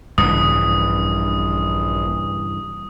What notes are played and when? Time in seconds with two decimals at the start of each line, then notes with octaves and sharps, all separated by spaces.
0.18 A#1 G2 C#3 E3 D#6